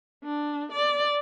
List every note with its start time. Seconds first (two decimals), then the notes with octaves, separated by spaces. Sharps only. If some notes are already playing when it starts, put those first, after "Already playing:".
0.24 D4
0.72 D5